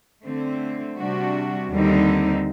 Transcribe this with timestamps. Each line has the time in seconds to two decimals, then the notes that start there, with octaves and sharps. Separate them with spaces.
0.24 D3 A3 C4
0.98 C3 G3 D4 F#4
1.71 D#2 D3 G3 C4 D#4